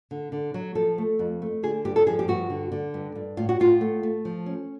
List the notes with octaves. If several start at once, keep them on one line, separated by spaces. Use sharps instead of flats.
D3
D3
F#3
F3 A4
A3
F2
A3
D3 G#4
G2 G4
A4
F3 G#4
G4
G2 F#4
D3
D3
G2
G2
A2 F4
F#4
A2 F4
A3
A3
F3
C#4